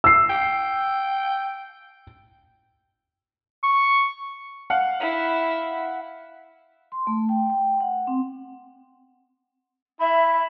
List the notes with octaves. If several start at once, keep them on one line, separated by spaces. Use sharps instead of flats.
E6 C7
G5
C#6
F5 F#5
E4
C6
A3
G5
G5
F#5
C4
E4 E5 B5